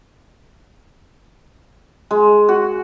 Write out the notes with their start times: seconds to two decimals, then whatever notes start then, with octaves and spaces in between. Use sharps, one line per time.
2.11 G#3
2.49 F#4